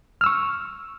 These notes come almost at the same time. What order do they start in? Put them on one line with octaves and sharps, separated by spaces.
F6 E6 C#6